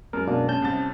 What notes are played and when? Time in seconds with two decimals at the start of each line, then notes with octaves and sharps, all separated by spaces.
0.13 F#2 G#3 A#4
0.27 B2 A#3 D4
0.48 C#4 A5 G6
0.62 C2 C3 A6